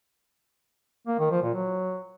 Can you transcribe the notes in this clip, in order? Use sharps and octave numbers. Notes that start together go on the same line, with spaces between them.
A#3
D#3
F3
A#2
F#3